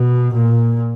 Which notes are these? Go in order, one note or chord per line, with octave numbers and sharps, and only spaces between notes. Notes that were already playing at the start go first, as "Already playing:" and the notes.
Already playing: B2
A#2